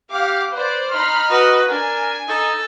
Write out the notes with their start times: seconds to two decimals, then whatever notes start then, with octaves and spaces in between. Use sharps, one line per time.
0.12 G4 F5 F#5 D6
0.52 B4 C5 D5
0.90 D#4 B5 C6 F6
1.30 F#4 B4 D#5
1.69 D4 A#4 G#5
2.28 D#4 A4